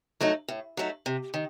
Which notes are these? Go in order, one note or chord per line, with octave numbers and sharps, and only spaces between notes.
F#3 A3 D#4
A2
F#3 A3 D#4
C3
D#3